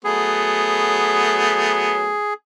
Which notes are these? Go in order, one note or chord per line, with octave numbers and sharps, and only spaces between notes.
F#3 A3 B3 G#4